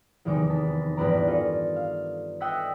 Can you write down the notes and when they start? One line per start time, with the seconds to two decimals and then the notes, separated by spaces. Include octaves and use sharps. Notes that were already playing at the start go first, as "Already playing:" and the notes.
0.25 F1 E2 D#3 G#3 D6
0.50 A5 B6
0.97 A1 E2 G2 B4 D5 A#5
1.27 F4 A4 A#4
1.76 F5
2.41 D5 D#5 F#5 G5 E6 B6